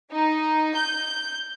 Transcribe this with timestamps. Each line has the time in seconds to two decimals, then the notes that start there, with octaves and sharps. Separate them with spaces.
0.12 D#4
0.76 G6